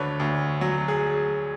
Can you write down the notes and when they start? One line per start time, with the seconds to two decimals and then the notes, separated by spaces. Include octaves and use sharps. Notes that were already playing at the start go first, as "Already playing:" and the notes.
Already playing: D2 D3 B4 C#5
0.20 D2
0.61 F#3
0.88 G#4